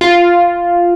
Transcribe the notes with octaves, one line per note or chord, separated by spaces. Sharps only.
F4